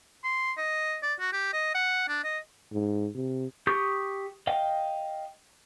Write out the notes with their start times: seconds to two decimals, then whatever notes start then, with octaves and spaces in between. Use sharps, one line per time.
0.24 C6
0.58 D#5
1.03 D5
1.20 F#4
1.33 G4
1.54 D#5
1.75 F#5
2.09 D4
2.24 D#5
2.73 G#2
3.15 C3
3.67 G4 C#6 D#6 G6
4.47 D#5 F5 G5